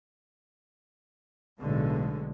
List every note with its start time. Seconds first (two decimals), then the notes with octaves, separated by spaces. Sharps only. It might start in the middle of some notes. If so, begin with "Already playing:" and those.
1.60 B1 A2 D3 G#3